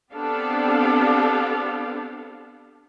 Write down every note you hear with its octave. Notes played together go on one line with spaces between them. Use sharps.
B3 C4 D4 G4 A4 F5